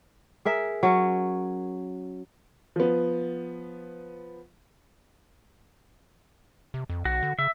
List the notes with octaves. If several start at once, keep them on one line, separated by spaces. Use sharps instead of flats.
G#4 A#4 E5
F#3 C#4
F3 B3
C3
F2
B1 F#4
D3
C#3 E5